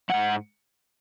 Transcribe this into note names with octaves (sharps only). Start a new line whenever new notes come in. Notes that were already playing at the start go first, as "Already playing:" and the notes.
G#2 F3 F#5